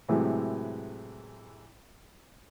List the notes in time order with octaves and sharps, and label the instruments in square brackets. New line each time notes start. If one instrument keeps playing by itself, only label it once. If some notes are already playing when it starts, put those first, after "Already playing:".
[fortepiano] A2 C3 E3 F#3 G#3